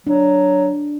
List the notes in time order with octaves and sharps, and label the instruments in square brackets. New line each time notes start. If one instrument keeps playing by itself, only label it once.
[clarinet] F#3 [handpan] D4